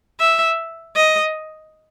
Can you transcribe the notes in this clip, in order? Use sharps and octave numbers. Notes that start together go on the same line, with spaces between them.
E5
D#5